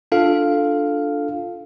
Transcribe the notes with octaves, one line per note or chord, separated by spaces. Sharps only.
D4 F4 A4 F5